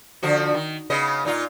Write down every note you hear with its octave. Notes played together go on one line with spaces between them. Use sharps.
D3 F3 F#4
D#3
C#3 B3 D#5
A#2 D#4 F4